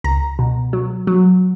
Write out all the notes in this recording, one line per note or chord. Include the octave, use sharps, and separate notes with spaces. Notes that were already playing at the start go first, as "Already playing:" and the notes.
C#2 A#5
B2
F#3
F#3